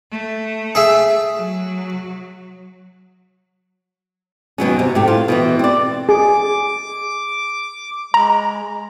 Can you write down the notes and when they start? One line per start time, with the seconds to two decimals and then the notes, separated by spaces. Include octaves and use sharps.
0.12 A3
0.75 G#4 E5
1.35 F#3
4.58 D#2 B2 F#3 C#4
4.79 C3
4.95 A2 G4
5.08 F4
5.28 B2 D#3 E3
5.59 C4 D5
6.09 G#4 D6
8.14 G#3 A#5